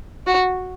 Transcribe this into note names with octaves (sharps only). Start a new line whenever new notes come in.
F#4